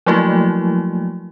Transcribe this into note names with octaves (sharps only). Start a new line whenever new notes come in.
F3 F#3 A3 A#3 E4 F#4